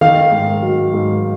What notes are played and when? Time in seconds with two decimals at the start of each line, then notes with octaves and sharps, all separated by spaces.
0.01 D#3 F5
0.32 G#2
0.62 F#3
0.93 G#2